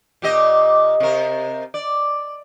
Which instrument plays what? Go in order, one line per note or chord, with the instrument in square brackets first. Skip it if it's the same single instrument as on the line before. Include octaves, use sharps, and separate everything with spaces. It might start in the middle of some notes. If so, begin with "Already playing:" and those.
[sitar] A#2 G4 D#5
C3 A#4
D5